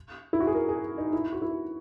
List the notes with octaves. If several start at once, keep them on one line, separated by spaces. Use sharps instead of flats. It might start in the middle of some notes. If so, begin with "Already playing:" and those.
E4
F#4
G#4
A#4
G#4
D#4
E4
F#4
E4